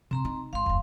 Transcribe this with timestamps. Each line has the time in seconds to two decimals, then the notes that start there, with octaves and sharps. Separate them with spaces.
0.11 C3 C4 A#5 C6
0.25 D#4
0.53 G#1 F5 C6
0.66 F1 D#2